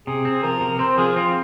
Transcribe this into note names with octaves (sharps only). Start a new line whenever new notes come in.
C3 G#4
C4
F3 A#4
C3
C4 C5
F3 G#4
C4 F4